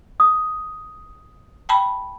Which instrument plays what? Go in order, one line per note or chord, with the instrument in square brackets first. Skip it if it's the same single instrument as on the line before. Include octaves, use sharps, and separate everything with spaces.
[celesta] D#6
[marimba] G5 A5 B5